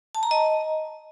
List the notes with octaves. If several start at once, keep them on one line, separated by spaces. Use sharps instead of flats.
A5
A#5
D#5